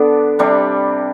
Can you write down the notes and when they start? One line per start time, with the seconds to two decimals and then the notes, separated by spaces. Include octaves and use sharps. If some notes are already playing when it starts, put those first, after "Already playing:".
Already playing: D3 B3 D4
0.39 C3 G3 D4